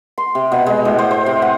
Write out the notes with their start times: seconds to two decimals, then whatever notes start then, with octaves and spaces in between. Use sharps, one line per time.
0.18 C6
0.35 C3
0.52 B2
0.66 G#3
0.85 A2
0.98 C5
1.11 C5
1.26 C3
1.42 F#5